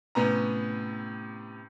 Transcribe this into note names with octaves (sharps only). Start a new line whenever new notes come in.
A2 C3 B3 C#4 A#5